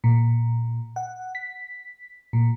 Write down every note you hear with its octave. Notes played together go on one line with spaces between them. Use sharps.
A#2
F#5
B6
A#2